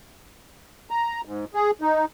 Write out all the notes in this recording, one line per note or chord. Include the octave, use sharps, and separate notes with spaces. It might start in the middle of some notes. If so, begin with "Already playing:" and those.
A#5
G#2
G#4
D#4